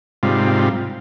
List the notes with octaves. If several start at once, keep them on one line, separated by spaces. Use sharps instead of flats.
G#2 C3 G3 F4